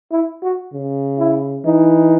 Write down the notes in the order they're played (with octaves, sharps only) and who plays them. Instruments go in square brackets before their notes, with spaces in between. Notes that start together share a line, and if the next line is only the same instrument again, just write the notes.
[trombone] E4
F#4
[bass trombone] C#3
[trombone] E4
[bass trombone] E3 [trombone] D#4